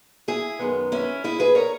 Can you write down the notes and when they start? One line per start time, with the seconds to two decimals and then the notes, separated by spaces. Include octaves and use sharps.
0.28 E4 G#4
0.59 F#2 D#3 G#3 B3
0.92 C#4 E4
1.24 E4 G#4
1.40 G#4 B4
1.55 A#4 C#5